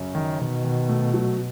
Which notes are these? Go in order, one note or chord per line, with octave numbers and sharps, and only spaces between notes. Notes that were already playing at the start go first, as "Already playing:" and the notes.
Already playing: F#2 C#3
D#3
B2 D#3
D#3
A3
F#3